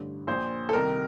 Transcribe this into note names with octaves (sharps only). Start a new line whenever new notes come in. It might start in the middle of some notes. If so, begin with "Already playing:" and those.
Already playing: A1 G2 D3
A#1 A#2 C5
A4
C2 C3 D#3 A#4